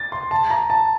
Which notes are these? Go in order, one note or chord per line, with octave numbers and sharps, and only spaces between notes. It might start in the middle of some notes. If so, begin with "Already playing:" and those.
Already playing: A6
C6
A5
A#5
A5